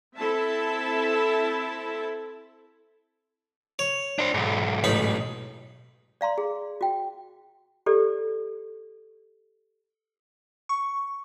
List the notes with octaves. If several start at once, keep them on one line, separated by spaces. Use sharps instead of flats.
C4 E4 A4 E5 A5
C#5
D4 C5
B1 G#2
A1 D#4 B5
D5 F5 A#5 C6
G#4
F#4 G5
G4 A4 D5
C#6